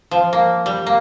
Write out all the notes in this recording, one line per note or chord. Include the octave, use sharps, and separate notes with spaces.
F3
A#3
G3
A#3